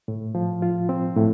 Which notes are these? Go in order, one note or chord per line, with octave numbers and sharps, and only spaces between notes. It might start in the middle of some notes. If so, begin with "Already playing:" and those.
A2
F3
F4
C4
A2